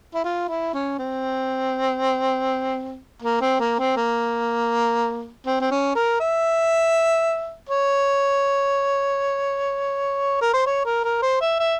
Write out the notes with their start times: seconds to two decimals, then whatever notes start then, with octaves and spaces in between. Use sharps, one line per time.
0.15 E4
0.24 F4
0.49 E4
0.74 C#4
0.99 C4
3.22 A#3
3.41 C4
3.60 A#3
3.79 C4
3.97 A#3
5.46 C4
5.61 C4
5.71 C#4
5.96 A#4
6.20 E5
7.69 C#5
10.41 A#4
10.54 C5
10.66 C#5
10.86 A#4
11.04 A#4
11.22 C5
11.41 E5
11.60 E5